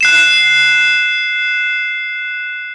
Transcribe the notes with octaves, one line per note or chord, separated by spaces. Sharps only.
F#6 C7 E7